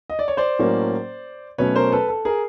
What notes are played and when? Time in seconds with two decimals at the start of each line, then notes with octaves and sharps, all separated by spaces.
0.10 D#5
0.19 D5
0.28 C#5
0.37 C5 D5
0.59 A2 F#3 A#3 C#4
1.58 B2 F#3 A3 C#4 B4 C#5
1.76 A#4 C5
1.92 A4 B4
2.09 A4
2.25 G#4 A#4